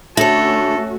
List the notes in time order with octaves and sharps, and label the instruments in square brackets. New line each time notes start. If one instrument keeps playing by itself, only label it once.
[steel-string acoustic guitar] D3 C#5 [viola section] A3 C#4 F#4 [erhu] A4 [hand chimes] E5 A#6